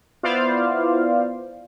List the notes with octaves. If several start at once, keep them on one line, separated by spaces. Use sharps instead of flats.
B3 E4 F4 C5 D5 F5